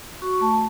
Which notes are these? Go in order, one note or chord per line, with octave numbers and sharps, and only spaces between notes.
F#4 C#6
C#6
A3 A5
A5